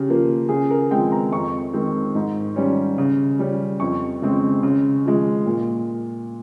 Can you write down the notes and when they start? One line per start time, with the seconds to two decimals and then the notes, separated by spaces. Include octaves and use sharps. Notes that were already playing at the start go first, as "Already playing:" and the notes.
Already playing: C#3 G4
0.08 F3 A#3
0.49 C#3 G#4
0.70 A#4
0.90 F3 G#3 C4 G5
1.12 A#5
1.32 F2 C#6
1.74 D#3 G#3 C4
2.15 G#2
2.56 G3 C#4
2.98 C#3
3.39 G3 C#4
3.80 F2 C#6
4.22 C#3 G#3 C4
4.63 C#3
5.05 F3 G#3
5.46 A#2